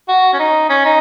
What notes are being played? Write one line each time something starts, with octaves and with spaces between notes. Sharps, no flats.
F#4
C#4
D#4
C#4
D#4